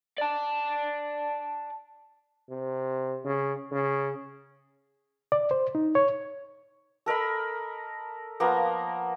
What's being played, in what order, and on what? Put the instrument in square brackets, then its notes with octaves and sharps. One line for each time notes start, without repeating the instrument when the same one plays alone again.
[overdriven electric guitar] D5 A5
[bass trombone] C3
C#3
C#3
[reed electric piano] D5
C5
D#4
C#5
[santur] A4 A#4 D#5 B5
F3 A#3 B3 A#5